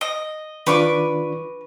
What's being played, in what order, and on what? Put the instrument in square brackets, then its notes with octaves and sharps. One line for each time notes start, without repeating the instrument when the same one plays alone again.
[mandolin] D#5
[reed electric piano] D#3 D4 F4 [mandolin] B4 C#6 D6